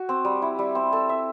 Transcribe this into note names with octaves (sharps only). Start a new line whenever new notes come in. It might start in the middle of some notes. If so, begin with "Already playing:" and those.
Already playing: F#4
C4
G3
E4
G3
C4
A4
E5